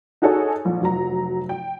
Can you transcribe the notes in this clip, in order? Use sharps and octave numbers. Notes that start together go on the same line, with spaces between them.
D#4 F#4 G#4 A4 C#5
A#1
F1 F#3 A#5
G5